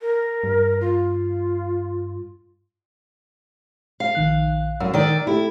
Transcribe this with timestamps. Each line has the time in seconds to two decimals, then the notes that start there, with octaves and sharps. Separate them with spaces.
0.01 A#4
0.44 G2
0.81 F4
4.00 F5
4.15 A#1 D#3 F#6
4.80 F#2 E6
4.94 D#3 D5
5.27 A3 E4 G4 A4